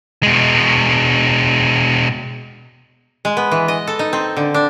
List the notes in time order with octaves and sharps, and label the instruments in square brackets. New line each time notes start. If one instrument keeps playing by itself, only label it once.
[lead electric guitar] B2 G#3
[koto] G#3
B3
E3
D#5
A4
D#4
C4
D3
D4